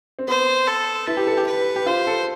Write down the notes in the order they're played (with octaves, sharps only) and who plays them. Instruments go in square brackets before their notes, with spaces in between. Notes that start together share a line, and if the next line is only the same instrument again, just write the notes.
[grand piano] C4
[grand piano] B3 [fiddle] C5
[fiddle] A4
[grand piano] E4 [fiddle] B4
[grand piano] G4
A4
G4
[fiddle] B4
[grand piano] G4
[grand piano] F4 [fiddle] C5
[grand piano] A4